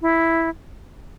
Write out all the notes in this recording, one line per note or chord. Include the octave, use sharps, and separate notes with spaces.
E4